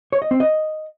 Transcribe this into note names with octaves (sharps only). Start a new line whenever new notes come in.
C#5
D#5
C4
D#5